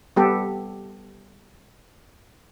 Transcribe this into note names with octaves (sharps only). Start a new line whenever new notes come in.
G3 B3 G4 A4